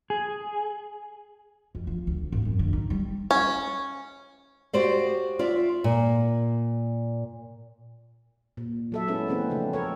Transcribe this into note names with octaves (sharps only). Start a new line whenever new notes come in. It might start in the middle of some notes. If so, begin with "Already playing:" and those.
G#4
F2
F3
D2
G#1
F#2
D3
D#4
G3
C#4
F#4 G4 C5 D5 F5
F4 D5 E5
A#2
A#2
F#3 A4 E5
G#3 B3 C#4 E4 A4
E3 G#3 A#3 C4 C#4 B4
C#3 F3 A3 D4
A4 A#4 C#5